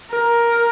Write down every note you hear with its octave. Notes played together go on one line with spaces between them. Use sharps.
A#4